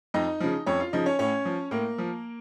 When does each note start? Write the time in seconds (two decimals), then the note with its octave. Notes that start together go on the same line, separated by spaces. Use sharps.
0.14 F2 D#4 D#5
0.40 C#3 F3
0.66 F2 C#4 C#5
0.80 F4 F5
0.93 C#3 F3 D#4 D#5
1.06 C#4 C#5
1.19 A2 C#4 C#5
1.45 F3
1.71 A2 A#3 A#4
1.98 F3